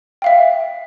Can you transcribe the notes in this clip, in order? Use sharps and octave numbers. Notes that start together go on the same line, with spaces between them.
E5 F5 G5